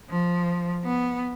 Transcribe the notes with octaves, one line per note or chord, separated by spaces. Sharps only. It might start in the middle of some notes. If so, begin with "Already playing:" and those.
F3
B3